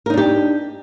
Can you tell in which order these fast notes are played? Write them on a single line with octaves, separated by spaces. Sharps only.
A#4 D#4 D4 G4